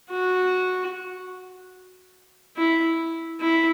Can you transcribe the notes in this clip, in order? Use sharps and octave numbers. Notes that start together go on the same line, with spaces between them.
F#4
E4
E4